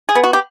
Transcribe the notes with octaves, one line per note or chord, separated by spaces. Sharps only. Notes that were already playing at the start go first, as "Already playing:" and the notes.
G#4
B3
F#4
G4